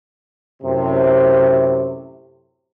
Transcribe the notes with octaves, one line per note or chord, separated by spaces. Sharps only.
F#2 A2 C3